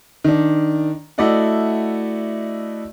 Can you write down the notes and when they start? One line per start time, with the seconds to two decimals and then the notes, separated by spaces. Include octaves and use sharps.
0.24 D#3 D4
1.18 A3 E4 F#4 D5 D#5 F#5